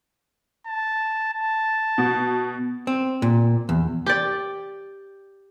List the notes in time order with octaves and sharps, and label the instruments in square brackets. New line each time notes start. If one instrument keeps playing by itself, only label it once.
[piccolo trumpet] A5
A5
[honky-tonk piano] B2
[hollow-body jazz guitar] C4
A#2
E2
[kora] G4 D5